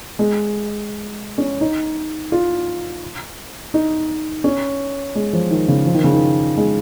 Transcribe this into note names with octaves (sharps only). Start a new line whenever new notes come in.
G#3
C#4
D#4
F4
D#4
C#4
G#3
F3
D#3
C#3
F3
D#3
C#3
D#3
G#3